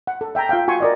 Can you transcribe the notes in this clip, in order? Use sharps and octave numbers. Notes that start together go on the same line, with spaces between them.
F#5
A4
E5 G5 A5 A#5
F4 E5 F5 G5
F4 F#4 G#5 C6 C#6
A#4 D5 D#5